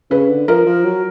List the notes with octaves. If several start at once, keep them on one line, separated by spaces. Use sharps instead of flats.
C#3 B4
D3
F3 A#4
F3
F#3